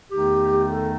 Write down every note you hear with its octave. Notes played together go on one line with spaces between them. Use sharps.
E2 D#3 A3 D#4 G4
A4